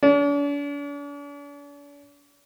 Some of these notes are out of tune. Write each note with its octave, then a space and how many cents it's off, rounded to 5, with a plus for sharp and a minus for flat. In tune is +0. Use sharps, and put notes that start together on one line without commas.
D4 -45